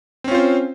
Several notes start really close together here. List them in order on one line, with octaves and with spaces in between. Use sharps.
C4 C#4 F4 C5